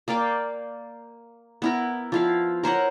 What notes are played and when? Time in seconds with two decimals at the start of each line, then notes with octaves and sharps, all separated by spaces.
0.08 A#3 D5 F5 G5
1.62 B3 E4 A#4
2.12 F3 E4 F5
2.63 A#4 C5 C#5 F#5